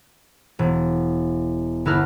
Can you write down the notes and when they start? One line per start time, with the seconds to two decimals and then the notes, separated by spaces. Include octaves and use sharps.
0.59 E1
1.85 G1 B3 E4 A#4 F6 F#6